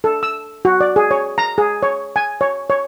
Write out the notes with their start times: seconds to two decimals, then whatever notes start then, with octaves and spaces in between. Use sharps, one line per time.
0.04 A4
0.23 E6
0.65 F#4
0.81 D5
0.96 G#4
1.11 C#5
1.38 A#5
1.58 G#4
1.83 C#5
2.16 G#5
2.41 C#5
2.70 C#5